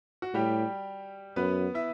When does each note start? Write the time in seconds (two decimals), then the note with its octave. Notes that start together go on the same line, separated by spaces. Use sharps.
0.22 F#4
0.34 A2 G3 G4
1.36 F#2 B3 B4
1.74 E4 E5